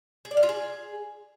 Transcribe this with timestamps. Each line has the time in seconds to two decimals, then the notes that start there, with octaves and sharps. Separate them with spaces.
0.25 G#4
0.31 D5
0.37 F5
0.43 F4
0.49 G#4